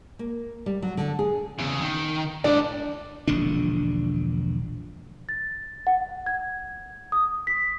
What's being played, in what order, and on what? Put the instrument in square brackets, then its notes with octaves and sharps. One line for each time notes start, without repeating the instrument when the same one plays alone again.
[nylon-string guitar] A#3
G3
F#3
D3
G#4
[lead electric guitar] E2 C#3
D#3
[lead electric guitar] G#2 D5 [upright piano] D4
[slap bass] E1 A#1 D3 D4
[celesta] A6
F#5
G#6
D#6
B6